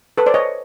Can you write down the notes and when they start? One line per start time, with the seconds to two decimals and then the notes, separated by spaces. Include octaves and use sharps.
0.18 A4 B4
0.26 C5 D5
0.34 C#5 D#5